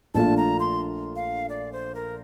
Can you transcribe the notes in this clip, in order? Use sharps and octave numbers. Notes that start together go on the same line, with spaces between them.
A#1 A#2 A3 D4 F4 A5
A#5
C6
F5
D5
C5
A#4